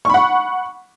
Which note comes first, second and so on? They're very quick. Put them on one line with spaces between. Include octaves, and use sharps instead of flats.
C#6 B5 F#5